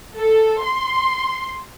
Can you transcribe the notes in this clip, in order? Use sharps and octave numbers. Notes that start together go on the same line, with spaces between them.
A4
C6